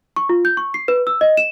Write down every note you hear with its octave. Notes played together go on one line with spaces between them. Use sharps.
C#6
F4
G6
C#6
C7
B4
E6
D#5
E7